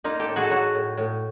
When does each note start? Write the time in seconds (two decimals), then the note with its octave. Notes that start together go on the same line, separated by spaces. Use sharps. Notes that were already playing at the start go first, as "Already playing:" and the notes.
0.04 A#3 D#4 F4
0.19 G4 A4
0.28 A2
0.36 F#4 G#4
0.44 A4
0.50 F#3 F#4 G#4
0.75 A2
0.97 A2